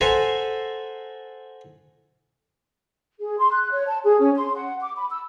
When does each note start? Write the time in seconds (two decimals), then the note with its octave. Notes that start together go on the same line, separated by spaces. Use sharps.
0.01 A4 C5 E5 F#5 G#5 A#5
3.19 G#4
3.39 C6
3.52 F#6
3.71 C#5
3.87 A5
4.05 G#4
4.20 C#4
4.37 C6
4.55 F#5
4.81 D6
4.96 B5
5.10 E6